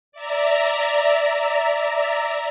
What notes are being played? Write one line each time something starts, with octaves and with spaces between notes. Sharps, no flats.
D5 E5 A#5